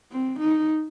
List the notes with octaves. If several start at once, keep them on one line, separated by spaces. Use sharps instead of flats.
C4
D#4